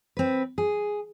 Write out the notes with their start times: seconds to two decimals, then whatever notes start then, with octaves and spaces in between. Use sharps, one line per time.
0.17 C4 B4
0.58 G#4